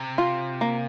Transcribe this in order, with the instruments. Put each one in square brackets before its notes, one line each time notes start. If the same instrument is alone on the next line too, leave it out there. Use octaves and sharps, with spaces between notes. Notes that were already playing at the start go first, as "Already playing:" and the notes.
Already playing: [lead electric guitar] C3
[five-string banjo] F4
A#3